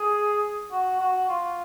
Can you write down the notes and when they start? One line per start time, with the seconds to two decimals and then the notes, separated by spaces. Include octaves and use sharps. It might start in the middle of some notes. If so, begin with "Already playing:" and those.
Already playing: G#4
0.72 F#4
1.00 F#4
1.29 F4